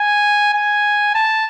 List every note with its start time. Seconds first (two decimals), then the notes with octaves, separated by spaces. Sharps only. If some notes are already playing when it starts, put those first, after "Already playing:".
Already playing: G#5
0.54 G#5
1.14 A5